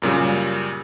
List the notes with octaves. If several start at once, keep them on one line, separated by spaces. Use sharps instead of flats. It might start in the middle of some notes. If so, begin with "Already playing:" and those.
F#2 A#2 C#3 G3